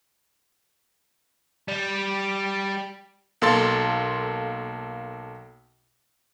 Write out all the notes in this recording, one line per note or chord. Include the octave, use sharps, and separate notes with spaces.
G3
B1 A#3 A4 C6 A6